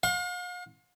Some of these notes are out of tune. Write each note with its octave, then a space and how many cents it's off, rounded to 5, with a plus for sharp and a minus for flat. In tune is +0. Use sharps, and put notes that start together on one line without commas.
F5 +45 C6 +35